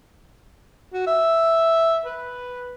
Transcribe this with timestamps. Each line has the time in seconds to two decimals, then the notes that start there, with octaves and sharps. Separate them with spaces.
0.93 F#4
1.07 E5
2.05 B4